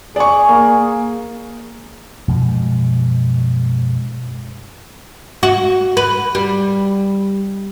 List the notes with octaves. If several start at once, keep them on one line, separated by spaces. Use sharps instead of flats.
G#4 D5 C#6
A#3
F#2 B2 F3 G#3
F#4
B4
G3